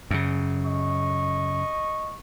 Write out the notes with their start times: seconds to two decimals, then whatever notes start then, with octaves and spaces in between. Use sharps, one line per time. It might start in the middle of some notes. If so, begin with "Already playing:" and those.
0.11 F#2 C#3
0.65 D#5 C#6